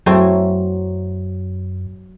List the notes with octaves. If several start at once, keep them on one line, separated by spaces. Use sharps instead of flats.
F#2 F#3 A3 C4 E4